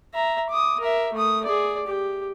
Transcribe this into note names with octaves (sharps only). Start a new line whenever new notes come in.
E5 A#5
D6 D#6
A#4 E5
A3 D#6
G#4 D5
G4